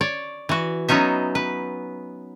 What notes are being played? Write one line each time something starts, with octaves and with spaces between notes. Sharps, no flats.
C#5 D5
E3 F#4
F#3 B3 C#4 D#4 E5
B4